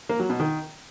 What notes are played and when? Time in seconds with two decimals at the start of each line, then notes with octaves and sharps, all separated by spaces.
0.09 A#3
0.20 F#3
0.30 B2
0.40 D#3